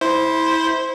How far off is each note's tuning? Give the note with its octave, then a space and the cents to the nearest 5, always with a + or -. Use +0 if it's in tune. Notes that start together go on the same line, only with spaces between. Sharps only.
E4 -20 C5 +0